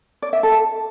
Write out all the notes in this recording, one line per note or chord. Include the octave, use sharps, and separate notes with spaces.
D5
E5
A4